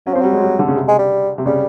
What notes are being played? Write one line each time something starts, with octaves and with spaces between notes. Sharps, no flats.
F#3 C#4
F3 C4
F#3 G3
G#3
G3
D3
C#3
C3
G#3
G3
C3
C#3 G3